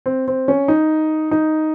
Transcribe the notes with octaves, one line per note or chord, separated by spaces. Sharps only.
C4
C4
C#4
D#4
D#4